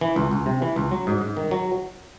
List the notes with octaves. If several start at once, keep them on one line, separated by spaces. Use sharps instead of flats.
E3
C#2
C#2
C3
E3
C#2
F#3
G#2
G#2
D#3
F#3